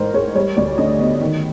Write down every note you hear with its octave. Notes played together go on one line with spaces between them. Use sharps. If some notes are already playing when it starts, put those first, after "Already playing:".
Already playing: A1 G#2 A#4 C5
G#3 C#5
G3 C#5
D2 D5
D3 D#5
B3
D#3